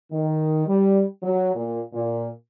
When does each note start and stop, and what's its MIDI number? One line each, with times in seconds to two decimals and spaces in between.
0.11 0.64 51
0.67 1.03 55
1.23 1.54 54
1.55 1.80 46
1.93 2.28 46